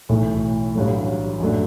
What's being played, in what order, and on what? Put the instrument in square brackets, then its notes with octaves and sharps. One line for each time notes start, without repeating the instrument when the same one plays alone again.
[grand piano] B1 A2 E3 A3
A1 G2 F#3 A3
F#2 F#3 A3 D4